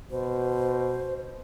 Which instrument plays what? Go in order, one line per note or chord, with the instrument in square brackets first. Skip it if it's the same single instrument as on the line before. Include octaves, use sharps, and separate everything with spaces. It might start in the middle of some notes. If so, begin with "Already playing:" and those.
[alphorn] B2 [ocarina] C5